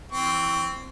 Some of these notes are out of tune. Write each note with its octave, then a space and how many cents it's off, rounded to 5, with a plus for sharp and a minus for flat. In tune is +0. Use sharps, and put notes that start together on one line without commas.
E3 +0 C4 +0 C#6 +25